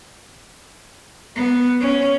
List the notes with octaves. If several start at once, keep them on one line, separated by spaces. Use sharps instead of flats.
B3
C#4